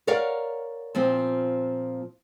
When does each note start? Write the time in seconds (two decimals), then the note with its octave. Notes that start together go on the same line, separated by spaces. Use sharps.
0.07 A#4 C#5 D5 F5 F#5
0.95 A#2 F3 C4